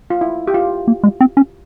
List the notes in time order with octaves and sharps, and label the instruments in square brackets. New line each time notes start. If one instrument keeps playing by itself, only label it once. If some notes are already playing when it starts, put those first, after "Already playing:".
[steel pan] F4
E4
G4
F4
[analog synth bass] A#3
G#3
C4
C#4